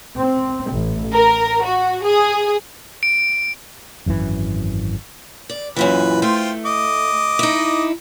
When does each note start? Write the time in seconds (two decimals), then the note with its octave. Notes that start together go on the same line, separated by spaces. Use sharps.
0.17 C4
0.72 A1
1.14 A#4
1.65 F#4
2.04 G#4
3.03 D7
4.06 G#1 F#2 A#2 E3
5.50 D5
5.76 F#2 A#2 E3 B4 B5
6.22 A3 F4 C5 G5
6.66 D#5 D6
7.39 D#4 E4